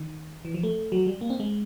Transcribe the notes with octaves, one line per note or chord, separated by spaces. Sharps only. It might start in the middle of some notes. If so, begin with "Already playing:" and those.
Already playing: D#3
E3
F3
A3
F#3
G3
A#3
C4
G#3